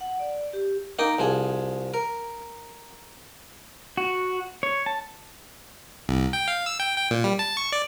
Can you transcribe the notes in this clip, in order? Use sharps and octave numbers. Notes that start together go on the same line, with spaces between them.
F#5
D5
G4
A#3 D#4 D#5 G5
C2 F3 G#4
A#4
F#4
C#5
A5
C2
G5
F5
E6
G5
G5
A#2
G3
A5
C#6
D5